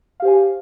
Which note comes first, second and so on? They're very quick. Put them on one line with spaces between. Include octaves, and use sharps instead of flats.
F5 G4 C5 G#5